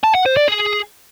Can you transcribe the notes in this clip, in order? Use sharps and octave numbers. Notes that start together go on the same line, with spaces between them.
A5
F#5
C5
D5
G#4